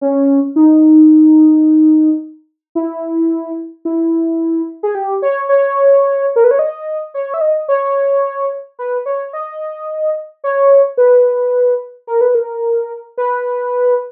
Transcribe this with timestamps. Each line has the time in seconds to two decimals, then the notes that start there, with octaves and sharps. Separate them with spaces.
0.01 C#4
0.56 D#4
2.75 E4
3.85 E4
4.83 G#4
4.95 G4
5.22 C#5
5.49 C#5
6.36 A#4
6.44 B4
6.51 C#5
6.59 D#5
7.14 C#5
7.34 E5
7.41 D#5
7.68 C#5
8.79 B4
9.06 C#5
9.33 D#5
10.44 C#5
10.97 B4
12.07 A#4
12.21 B4
12.35 A#4
13.18 B4